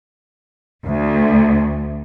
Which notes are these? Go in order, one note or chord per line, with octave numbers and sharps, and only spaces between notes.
D2